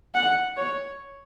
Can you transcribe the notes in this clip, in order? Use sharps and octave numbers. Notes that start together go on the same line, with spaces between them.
F#5
C#5